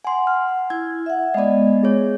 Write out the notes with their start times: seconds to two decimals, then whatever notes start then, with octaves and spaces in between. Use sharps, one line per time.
0.05 F#5 G#5 C6
0.27 F6
0.70 E4 G#6
1.06 E5 F#5
1.34 G#3 B3 D5 D#5
1.83 G#4 C#5